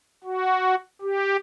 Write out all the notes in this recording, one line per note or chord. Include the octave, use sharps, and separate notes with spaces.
F#4
G4